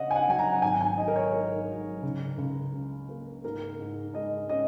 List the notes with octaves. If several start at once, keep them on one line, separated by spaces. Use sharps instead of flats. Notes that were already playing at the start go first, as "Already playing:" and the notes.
Already playing: C#3 C#4 D#5 F#5
G#5
F#5
F#3 G#5
A#5
F#5
G#1 G#5
G#5
D#4 D#5
A#4
C#5
G#2 A#4
F#3
C#2
C#2
C#3
A#3
G#2 A#4
G#2
G#3 D#5
C#4 D#5